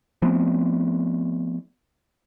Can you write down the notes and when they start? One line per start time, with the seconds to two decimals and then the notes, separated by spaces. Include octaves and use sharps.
0.22 F3 A3 B3 C4